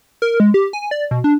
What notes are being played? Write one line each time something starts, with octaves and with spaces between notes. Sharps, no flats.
A#4
G#3
G4
G#5
D5
B2
D4